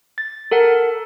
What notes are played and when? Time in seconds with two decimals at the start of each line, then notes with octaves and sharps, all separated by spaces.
0.18 A6
0.51 A4 A#4 F#5